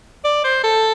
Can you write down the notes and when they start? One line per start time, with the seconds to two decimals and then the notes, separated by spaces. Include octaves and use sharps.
0.24 D5
0.44 C5
0.64 A4